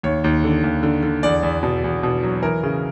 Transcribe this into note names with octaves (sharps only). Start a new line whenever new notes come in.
D#2 C#5
D#2
D3
D#2
D3
D3
E2 D5
E2
B2
E2
B2
F#3
E3 A#4
C#3